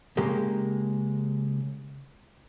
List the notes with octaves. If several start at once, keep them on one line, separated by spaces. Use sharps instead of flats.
C#3 G#3 A#3 G4 A#4